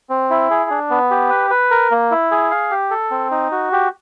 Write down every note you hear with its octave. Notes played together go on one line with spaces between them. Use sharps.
C4
E4
G#4
D4
B3
G4
B4
B4
A#4
A#3
E4
G#4
F5
G4
A4
C4
D#4
F#4
G4